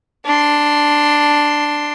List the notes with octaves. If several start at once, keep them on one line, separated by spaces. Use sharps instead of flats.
D4 C6